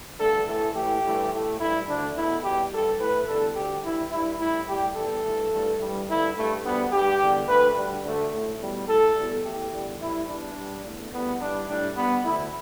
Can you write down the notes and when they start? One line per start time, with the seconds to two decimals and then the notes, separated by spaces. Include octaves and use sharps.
0.19 G2 D3 A3 A4
0.47 A2 E3 A3 A4
0.75 A2 E3 A3 G4
1.03 G2 E3 A3
1.32 A2 A3
1.59 G2 G3 E4
1.88 D2 D3 A3 D4
2.16 E2 B2 A3 E4
2.43 E2 B2 G3 G4
2.72 G2 G3 A4
2.99 A2 E3 A3 B4
3.27 E2 D3 G3 A4
3.56 D2 D3 G3 G4
3.83 G2 E3 G3 E4
4.11 G2 G3 E4
4.39 A2 E3 G3 E4
4.68 A2 G3 G4
4.96 E2 E3 G3 A4
5.24 G2 E3 A3
5.52 G2 E3 A3
5.80 G2 E3 G3
6.08 G2 D3 A3 E4
6.36 G2 G3 A3
6.63 D2 D3 G3 B3
6.92 G2 G3 G4
7.19 E2 D3 G3
7.48 D2 D3 A3 B4
7.77 G2 D3 G3
8.05 D2 D3 A3
8.32 A2 A3
8.60 E2 B2 G3
8.88 A2 A3 A4
9.16 E2 B2 G3
9.44 E2 E3 A3 G4
9.72 E2 D3 G3
10.00 A2 E3 G3 E4
10.28 E2 E3 G3 D4
10.56 G2 G3
10.84 E2 D3 A3
11.12 E2 D3 G3 B3
11.40 G2 E3 G3 D4
11.68 A2 G3 D4
11.96 G2 G3 B3
12.24 D2 D3 A3 E4